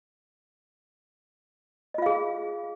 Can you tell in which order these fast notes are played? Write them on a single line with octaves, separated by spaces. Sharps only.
D#5 F4 F5 G#4